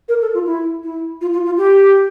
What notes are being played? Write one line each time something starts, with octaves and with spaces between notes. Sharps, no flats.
A#4
A4
F4
E4
E4
F4
F4
F4
G4